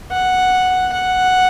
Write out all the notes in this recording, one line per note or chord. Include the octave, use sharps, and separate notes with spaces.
F#5
F#5